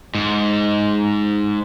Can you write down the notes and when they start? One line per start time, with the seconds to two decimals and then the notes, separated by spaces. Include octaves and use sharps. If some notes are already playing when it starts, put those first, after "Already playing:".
0.15 G#2